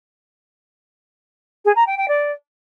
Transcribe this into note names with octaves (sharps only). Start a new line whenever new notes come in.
G#4
A#5
G5
G5
D5